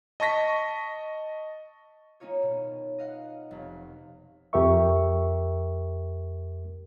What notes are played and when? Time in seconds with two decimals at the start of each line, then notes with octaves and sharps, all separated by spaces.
0.20 D#5 A5 C#6 A#6 B6
2.20 A#3 C#4 D#4 F4 C#5
2.43 B2
2.98 D#5 F5 F#5
3.51 F1
4.53 F2 G4 A#4 E5 C#6